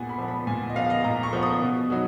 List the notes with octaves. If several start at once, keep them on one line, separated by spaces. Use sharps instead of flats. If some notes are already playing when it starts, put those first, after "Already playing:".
Already playing: A#2 B3 F#5 G#5
B5
F3 B3
B5
A#2 G#5
D#5
F3 B3 F5
D#5
A#2 A#5
C#6
F3 B3
D#6
B2
F#3 B3 D#4